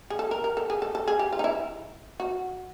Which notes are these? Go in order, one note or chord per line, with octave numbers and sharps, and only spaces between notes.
G#4
A4
A#4
A#4
A4
G#4
A4
A4
G#4
G4
F4
D#4
E4
F#4